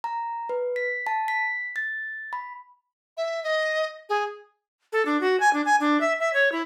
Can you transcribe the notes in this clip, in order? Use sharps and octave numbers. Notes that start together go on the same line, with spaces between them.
A#5
B4
B6
A5
B6
A6
B5
E5
D#5
G#4
A4
D4
F#4
G#5
D4
G#5
D4
E5
E5
C#5
E4